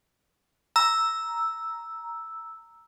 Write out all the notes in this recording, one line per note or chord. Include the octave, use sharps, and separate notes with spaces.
A#5 E6